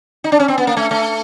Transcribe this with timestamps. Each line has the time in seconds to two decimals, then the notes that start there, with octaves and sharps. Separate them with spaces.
0.24 D#4
0.32 D4
0.40 C#4
0.48 C4
0.58 B3
0.67 A#3
0.77 A3
0.91 A3